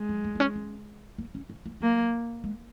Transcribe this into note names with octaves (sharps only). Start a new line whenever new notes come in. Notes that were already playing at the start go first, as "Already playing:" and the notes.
Already playing: G#3
F#3
A#3
A#3
C#4
C#4
A#3
C#4
C#4
A#3
F#3 A#3
G#3